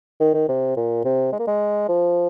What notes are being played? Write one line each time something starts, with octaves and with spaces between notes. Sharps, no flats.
D#3
D#3
C3
A#2
C3
G#3
A#3
G#3
F3